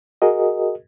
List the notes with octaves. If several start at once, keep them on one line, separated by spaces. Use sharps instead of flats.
F#4 G#4 A#4 D#5